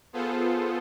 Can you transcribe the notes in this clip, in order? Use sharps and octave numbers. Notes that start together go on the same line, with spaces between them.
B3 F4 G#4 A4 C5